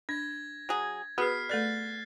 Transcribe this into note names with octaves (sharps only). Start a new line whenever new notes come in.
D4 G#6 A#6
F#3 G#4
B3 F#4 G#4 B4 F6 B6 C7
A3 A4 D5 F#6 A6